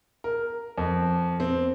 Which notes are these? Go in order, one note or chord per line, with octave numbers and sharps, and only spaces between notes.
A#4
F2
C4